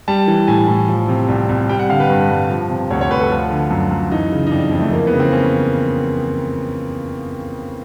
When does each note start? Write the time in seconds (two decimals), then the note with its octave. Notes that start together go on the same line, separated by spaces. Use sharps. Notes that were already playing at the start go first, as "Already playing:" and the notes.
0.08 G3 A5
0.28 E3
0.47 A2 G#5
0.68 A2
0.88 F3
1.08 C3
1.28 C2
1.49 C2
1.69 G3 G5
1.79 F#5
1.89 D3 F5
2.00 B4
2.10 G2
2.30 G2
2.49 F3
2.70 C3
2.90 D2 C#5
3.01 C#5
3.10 D2 B4
3.20 A4
3.30 F3 F4
3.50 D3
3.71 F#2
3.91 F#2
4.12 E3 D#4
4.32 C#3
4.46 D#4
4.51 F2 D4
4.72 F2
4.80 A3
4.92 E3 A#3
5.07 B3
5.13 C#3
5.20 C4
5.33 C#4